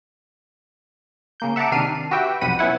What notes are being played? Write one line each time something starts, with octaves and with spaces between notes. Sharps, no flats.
C#3 A#3 G6
E5 F#5 A5 A#5 D6
C3 D#3 D4 F6 C7 D#7
F#4 G4 B4 E5 G5
B1 F2 C3 F#5 B5 D#7
B3 C#4 E4 F#5